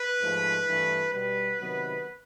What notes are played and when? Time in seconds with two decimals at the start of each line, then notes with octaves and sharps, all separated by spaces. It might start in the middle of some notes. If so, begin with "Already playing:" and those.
Already playing: B4
0.21 G#2 F3 A3
0.67 G2 E3 A3
1.13 B2 G3 B3 B4
1.59 C3 D#3 F#3 B3